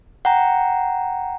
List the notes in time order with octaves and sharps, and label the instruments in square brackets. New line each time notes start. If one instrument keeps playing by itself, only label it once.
[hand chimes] F#5 G5 A#5